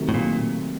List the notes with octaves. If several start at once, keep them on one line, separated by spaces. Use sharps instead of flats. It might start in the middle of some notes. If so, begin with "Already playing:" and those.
Already playing: C3 D#3 F#3 A3
A2
A#2